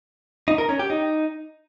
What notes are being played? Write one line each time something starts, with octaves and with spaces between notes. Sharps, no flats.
D#4
A#4
C#4
G4
D#4